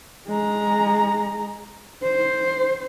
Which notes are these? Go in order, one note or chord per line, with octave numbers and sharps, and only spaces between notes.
G#3 A#5
C5